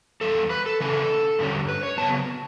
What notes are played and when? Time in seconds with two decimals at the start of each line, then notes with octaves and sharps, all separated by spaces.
0.21 E2 C#3 G3 A4
0.50 B4
0.66 A4
0.80 C#3 E3 A3 C#4 A4
1.39 G2 D3 G3 C#4
1.69 B4
1.83 C#5
1.98 C#3 F#3 B3 A5